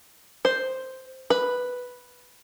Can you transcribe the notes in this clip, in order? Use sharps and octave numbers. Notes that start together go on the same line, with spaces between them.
C5
B4